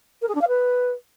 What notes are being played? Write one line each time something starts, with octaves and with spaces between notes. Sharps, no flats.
A#4
G#4
D4
F5
B4